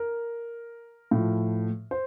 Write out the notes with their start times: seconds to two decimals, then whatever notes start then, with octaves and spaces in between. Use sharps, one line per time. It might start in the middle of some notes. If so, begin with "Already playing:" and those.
Already playing: A#4
1.11 A2
1.17 F3
1.91 C5